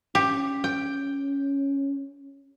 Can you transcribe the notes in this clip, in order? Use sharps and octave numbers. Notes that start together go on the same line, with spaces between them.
C#4 G4
G5